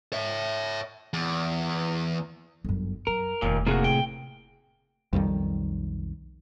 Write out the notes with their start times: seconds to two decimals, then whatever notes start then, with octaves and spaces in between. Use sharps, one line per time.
0.13 C#5 E5
1.13 E2
2.64 G1 F#2
3.07 F#2 A#4
3.42 F1 D#2 A#2 A3
3.67 A2 C3 A#3 F#4 G#4
3.84 G5
5.13 B1 F2 D#3 G3